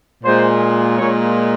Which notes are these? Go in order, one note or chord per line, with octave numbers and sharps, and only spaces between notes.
A#2 G#3 C5
A#2 G#3 C#5